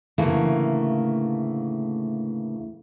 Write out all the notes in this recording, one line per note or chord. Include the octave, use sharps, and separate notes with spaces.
D2 A2 C#3 E3 A3 A#3